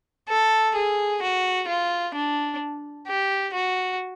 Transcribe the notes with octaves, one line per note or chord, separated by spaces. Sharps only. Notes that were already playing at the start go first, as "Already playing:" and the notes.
A4
G#4
F#4
F4
D4
G4
F#4